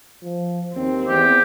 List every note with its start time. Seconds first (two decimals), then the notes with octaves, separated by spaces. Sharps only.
0.23 F3
0.74 D#2 C4
1.08 E2 G4